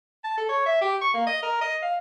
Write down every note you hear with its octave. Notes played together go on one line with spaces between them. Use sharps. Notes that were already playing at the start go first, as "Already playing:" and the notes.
A5
A4
C#5
E5
G4
C#6
A#3
D#5
A#4
D#5
F5